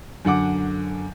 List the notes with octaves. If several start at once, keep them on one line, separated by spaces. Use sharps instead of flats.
F#2 D3 F#5 D6